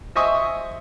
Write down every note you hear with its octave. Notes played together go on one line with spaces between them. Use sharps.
C5 D#5 E5 G#5 C#6 D#6